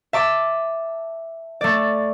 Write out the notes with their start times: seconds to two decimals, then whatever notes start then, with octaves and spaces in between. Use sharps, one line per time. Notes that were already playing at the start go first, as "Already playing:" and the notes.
0.13 E5 A5 D6
1.61 A3 D5